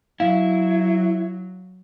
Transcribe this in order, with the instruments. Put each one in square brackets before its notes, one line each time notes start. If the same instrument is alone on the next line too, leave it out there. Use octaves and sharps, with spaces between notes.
[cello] F#3 [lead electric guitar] E4 [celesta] F5